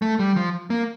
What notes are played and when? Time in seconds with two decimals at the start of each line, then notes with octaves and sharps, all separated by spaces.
0.02 A3
0.19 G3
0.36 F3
0.70 A#3